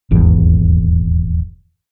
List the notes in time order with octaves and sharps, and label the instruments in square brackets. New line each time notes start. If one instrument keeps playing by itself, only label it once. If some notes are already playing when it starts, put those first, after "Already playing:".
[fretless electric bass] D#1 G#1 E2